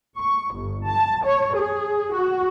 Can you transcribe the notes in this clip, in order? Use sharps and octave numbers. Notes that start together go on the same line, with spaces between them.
C#6
G1
A5
C#5
G#4
F#4